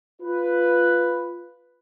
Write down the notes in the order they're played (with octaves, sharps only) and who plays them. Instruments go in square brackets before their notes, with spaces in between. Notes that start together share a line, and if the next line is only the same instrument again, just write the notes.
[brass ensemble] F4 B4